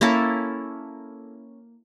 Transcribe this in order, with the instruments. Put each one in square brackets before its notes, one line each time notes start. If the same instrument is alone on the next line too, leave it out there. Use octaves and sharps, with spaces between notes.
[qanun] A#3 C#4 E4 A4